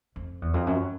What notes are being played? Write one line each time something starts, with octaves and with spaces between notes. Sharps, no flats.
F2
E2
F2
F#2